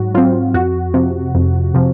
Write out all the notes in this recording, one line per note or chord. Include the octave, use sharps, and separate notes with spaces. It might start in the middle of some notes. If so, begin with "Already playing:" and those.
Already playing: G#2 F#3 F#4
F#3 C4 F4
F2 F#4
C3 F3
F2
C3 F3